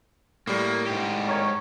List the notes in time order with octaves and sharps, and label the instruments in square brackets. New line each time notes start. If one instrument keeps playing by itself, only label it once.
[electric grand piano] A2 G3 [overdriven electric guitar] A#3
[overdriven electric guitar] G#2 G4
[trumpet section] A#4 C#5